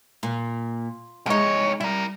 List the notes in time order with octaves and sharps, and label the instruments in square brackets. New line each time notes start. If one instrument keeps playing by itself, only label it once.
[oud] A#2
[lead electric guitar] C2 C#5 [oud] G#3 D#4
[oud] G3 [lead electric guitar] E4 A#4